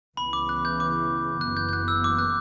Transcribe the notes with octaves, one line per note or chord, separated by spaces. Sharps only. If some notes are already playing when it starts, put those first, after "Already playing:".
C#2 C#3 E3 B3 B5
D6
F#6
G6
D6
F#1 F#2 E3 B3 F#6
G6
G6
F#6
E6
D6
F#6